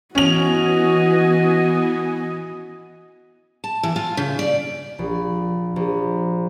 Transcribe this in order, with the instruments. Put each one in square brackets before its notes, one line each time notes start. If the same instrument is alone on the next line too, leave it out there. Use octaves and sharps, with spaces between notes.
[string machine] E3 B3 G#5 [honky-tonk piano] C#4 F7 [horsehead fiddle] F#4 D#5
[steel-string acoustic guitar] A5
E3
F4
C#3
D5
[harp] A#1
A#1